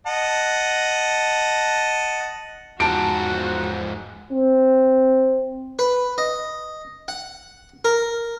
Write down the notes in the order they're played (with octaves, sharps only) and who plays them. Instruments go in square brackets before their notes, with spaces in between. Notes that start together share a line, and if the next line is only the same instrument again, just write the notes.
[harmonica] D#5 F#5 A5
[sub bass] E2 [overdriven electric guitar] G#2 F3 [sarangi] F#4 [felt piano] A5 D7
[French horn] C4
[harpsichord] B4
D#5
F#5
A#4